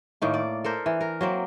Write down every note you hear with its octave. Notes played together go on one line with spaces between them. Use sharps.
A2 D#3 A#3
D5
A4 A#4 C5
E3
A#4
F#3 A#3 C4